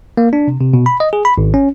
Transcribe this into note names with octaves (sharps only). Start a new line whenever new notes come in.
A#3
D4
C3
C3
B2
B5
D#5
G#4
B5
G#1
C#4